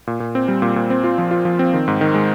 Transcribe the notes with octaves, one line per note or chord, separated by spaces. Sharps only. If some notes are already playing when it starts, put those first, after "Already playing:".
A#2
A#2
C4
G3
A#2
A#2
C4
F4
F3
F4
F3
C4
D#3
G#2
D#3
G#3